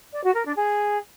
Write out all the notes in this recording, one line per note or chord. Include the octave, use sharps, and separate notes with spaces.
D5
F#4
A#4
D4
G#4